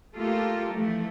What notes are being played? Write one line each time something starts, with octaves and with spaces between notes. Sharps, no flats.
A3 A#3 F4 G4 A4 A#4
E3 F3 A3